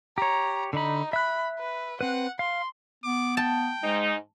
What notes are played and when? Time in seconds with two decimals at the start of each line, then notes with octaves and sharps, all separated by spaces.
0.18 G4 C#5 A#5
0.73 D3 D#4 B5
1.13 E5 B5 F#6
1.59 B4
2.01 C4 B4 F#5
2.39 F5 C6
3.04 B3 D6
3.37 G5 A5
3.83 G#2 G#3 D#4